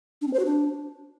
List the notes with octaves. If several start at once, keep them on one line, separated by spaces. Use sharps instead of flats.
D4
C4
C5
F#4
D4